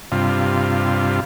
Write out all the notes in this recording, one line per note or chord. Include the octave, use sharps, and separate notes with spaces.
G2 C3 F4